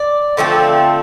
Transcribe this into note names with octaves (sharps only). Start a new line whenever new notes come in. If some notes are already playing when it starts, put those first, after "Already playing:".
Already playing: D5
D3 F3 A3 C4